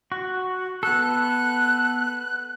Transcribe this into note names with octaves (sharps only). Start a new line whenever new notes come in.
F#4
B3 A4 F#6